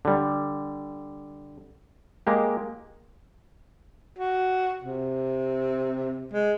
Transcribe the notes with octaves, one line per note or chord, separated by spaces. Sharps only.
D3 G3
G#3 A#3 G4
F#4
C3
G#3